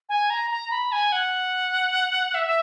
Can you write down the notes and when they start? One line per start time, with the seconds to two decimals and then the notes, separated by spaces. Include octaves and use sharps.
0.09 G#5
0.30 A#5
0.51 A#5
0.71 B5
0.92 G#5
1.12 F#5
2.34 E5